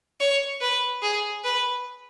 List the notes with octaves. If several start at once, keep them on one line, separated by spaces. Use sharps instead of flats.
C#5
B4
G#4
B4